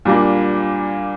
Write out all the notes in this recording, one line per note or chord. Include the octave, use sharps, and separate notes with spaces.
A#2 G3 A#3 D4